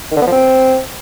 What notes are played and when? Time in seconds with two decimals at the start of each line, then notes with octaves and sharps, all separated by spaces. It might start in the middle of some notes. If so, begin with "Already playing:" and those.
0.11 D#3
0.17 D3
0.22 B3
0.27 F3
0.32 C4